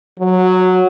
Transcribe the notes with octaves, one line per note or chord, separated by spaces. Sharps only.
F#3